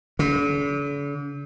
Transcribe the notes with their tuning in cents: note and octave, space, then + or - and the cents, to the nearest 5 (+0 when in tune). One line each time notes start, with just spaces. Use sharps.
D3 -45